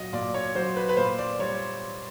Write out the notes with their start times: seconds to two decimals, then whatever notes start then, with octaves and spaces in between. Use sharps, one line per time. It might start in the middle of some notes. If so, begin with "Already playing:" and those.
Already playing: A#2 F#3 D#5
0.13 A#2 D5
0.34 C#5
0.55 F#3 C5
0.77 B4
0.89 B4
0.97 A#2 C5
1.18 D5
1.39 G3 C#5